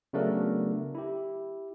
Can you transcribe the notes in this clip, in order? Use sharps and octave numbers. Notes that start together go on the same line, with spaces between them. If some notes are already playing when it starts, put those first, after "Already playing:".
C#3 F#3 A3 B3 D4 A#4
E4 G4